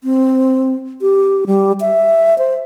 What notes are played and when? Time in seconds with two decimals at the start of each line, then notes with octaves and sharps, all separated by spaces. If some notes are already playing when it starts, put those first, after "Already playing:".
0.04 C4
1.02 G4
1.47 G3
1.81 E5
2.38 C5